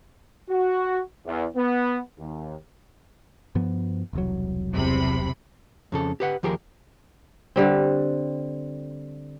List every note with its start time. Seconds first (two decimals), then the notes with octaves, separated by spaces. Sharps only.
0.49 F#4
1.26 E2
1.56 B3
2.18 D#2
3.55 G2 F3 B3
4.13 E1 C2 F#3
4.73 E2 C3 B5
5.92 F2 C#3 A4
6.20 G4 B4 F#5
6.43 D#2 F3 G4 G#4 A#4
7.56 D3 G3 C4